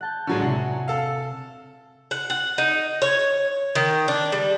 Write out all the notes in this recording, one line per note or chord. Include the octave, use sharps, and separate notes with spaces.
F#5 A5 G6
A1 D3 F#3 G#3 C#5
C3 F#5 G#5
A4 F5 E6
F#5
F#5
D#4
C#5
D#3
D4
G3